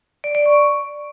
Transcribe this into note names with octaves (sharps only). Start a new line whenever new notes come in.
D5
D5
C#6